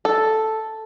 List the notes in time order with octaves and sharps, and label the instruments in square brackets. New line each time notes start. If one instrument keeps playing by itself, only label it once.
[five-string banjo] A4